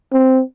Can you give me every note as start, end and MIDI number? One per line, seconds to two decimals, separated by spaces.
0.13 0.42 60